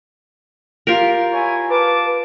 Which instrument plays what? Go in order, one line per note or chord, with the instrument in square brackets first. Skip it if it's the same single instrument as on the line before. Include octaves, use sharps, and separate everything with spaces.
[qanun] F4 G4 A#4
[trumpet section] E4 C#5 G#5
[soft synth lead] B4 [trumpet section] F5 A5 D6